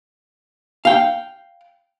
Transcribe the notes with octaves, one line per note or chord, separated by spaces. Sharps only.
F5 G5